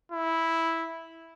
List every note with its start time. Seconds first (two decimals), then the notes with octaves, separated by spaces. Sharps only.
0.12 E4